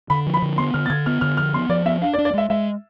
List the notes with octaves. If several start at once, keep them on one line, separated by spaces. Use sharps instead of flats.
D3 B5
F3
B5
D3
B3 C6
D3 F6
A6
D3 G#6
B3 F6
D3 F6
F3 F6
B3 C6
F3 D5
B3 E5
D4 F5
D5
D4
D5
G#3 E5
G#3 E5